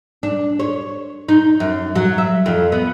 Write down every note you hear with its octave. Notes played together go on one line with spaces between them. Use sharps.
D4
C#5
D#4
F#2
F#3
E5
F2
B3